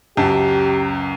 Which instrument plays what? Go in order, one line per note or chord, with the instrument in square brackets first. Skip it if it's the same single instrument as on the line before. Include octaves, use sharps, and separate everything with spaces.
[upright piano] C#2 F#2 A5 [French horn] G4